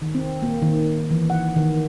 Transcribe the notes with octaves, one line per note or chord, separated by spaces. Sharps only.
D#3
C4
A#3
D#3
E3
F#5
D#3